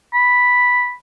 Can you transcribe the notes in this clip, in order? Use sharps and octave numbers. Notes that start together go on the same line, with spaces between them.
B5